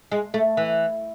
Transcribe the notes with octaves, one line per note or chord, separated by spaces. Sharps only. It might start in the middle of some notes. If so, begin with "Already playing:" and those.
G#3
A3
E3